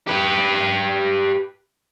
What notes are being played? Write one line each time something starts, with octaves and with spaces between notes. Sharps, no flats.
G4 B4